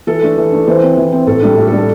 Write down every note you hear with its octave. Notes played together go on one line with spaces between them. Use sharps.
E3 A4
A3 D4
E3
A3 D4
E3 C5
C4
E3
C4
A2 A4
G3 D4 A4
A2
A4
G3 D4
A4